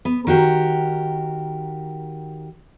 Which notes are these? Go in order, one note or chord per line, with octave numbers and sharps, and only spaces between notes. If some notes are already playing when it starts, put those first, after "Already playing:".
B3
D#3 F#4 G4 A#4